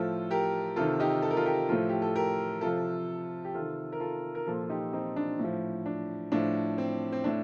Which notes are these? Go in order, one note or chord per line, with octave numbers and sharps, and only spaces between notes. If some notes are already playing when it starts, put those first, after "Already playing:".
Already playing: A2 F3 F4 A4
G4 A#4
C3 D#3 F4 A4
D#4 G4
A4
A#4
F4 A4
G4 A#4
A2 F3 F4 A4
G4
A4
G4 A#4
C3 F3 F4 A4
G4
C3 D#3 F4 A4
A#4
F4 A4
A#4
A#2 F3 F4 A4
F4
D#4 G4
C4 D#4
D4
A2 F3
D4
A2 F3 D4
C4
C4
A2 D4